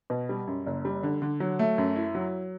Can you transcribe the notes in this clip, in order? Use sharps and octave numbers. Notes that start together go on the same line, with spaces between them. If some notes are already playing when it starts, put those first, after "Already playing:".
B2
G3
F#2
F#1
G3
D3
D3
F#3
A3
F#2
E4
F#3